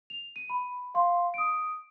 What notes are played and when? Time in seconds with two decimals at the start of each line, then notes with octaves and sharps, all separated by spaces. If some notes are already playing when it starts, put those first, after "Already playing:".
0.10 F7
0.36 D#7
0.50 B5
0.94 F5 C6
1.34 D#6 D7